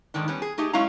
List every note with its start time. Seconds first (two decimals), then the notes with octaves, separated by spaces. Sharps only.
0.14 G#2 D3 D#3 D4
0.28 G3 B3 C#4
0.42 G#4
0.58 A3 D#4 G4 G#4
0.73 F#3 G#3 C#4 E4 F5 A#5